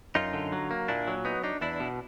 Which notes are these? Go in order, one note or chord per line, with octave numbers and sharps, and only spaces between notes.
F#2 D#4 F4
D3
F#3
A#3
A#2 D4 E4
F#3
B3 D#4
D4 D#4
E2 D4 E4
B2